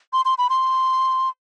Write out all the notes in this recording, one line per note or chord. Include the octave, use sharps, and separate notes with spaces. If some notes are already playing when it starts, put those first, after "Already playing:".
C6
C6
B5
C6